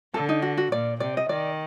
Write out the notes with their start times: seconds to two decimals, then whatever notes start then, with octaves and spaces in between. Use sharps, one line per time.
0.14 D3 A4
0.29 D#4
0.42 F#4
0.57 F#4
0.72 A#2 D5
1.00 C3 D5
1.17 D#5
1.29 D#3 D5